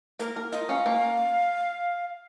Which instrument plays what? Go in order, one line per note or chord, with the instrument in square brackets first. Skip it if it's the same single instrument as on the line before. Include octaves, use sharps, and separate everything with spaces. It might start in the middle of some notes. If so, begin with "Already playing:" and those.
[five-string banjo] A#3 [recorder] A#4
[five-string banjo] A#4
[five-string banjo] F4 [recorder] D#5
[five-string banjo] C#4 [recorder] F5
[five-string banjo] A#3